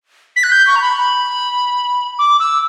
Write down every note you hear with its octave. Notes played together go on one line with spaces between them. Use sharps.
B6
F#6
G6
C#6
A#5
B5
B5
D6
E6